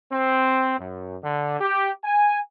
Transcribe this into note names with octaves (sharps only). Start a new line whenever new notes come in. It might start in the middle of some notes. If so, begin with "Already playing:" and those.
C4
F#2
D3
G4
G#5